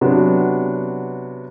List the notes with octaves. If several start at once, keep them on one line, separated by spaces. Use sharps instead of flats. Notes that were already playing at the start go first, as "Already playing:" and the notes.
C3 F#3 B3 D4